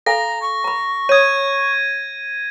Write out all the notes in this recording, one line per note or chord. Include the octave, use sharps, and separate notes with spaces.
A4 F5 G#5 A#5 A#6
C#6
A#5 B5
C#5 D#6 G#6 D#7